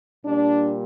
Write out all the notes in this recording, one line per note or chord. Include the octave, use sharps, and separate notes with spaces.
A#2 G3 D4